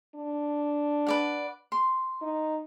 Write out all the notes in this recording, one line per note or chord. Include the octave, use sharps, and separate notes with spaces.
D4
B4 D5 F#5
C6
D#4